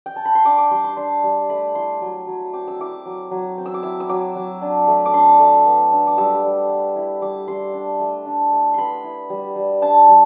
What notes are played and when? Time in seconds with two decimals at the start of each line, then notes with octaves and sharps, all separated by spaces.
0.06 G5
0.16 A5
0.25 B5
0.35 C6
0.45 D4 D6
0.58 D6
0.71 G3 C6
0.84 C6
0.97 D4 C6
1.24 G3
1.49 A3 B5
1.75 E4 C6
2.01 F#3
2.27 F#3
2.53 C4 D6
2.68 E6
2.79 E4 D6
3.06 F#3
3.31 F#3
3.58 C4
3.66 E6
3.74 D6
3.83 E4 E6
4.00 E6
4.09 F#3 D6
4.36 F#3
4.62 D4
4.88 A3
5.05 D6
5.13 D4 C6
5.40 A3
5.66 B3
5.92 D4
6.07 D6
6.18 G3 E6
6.44 G3
6.69 B3
6.96 E4
7.22 G3 D6
7.48 G3 C6
7.73 D4
8.00 A3
8.26 D4
8.52 A3
8.74 B3 B5 C6
9.04 E4
9.30 G3
9.56 G3
9.82 D4 A5
10.08 G3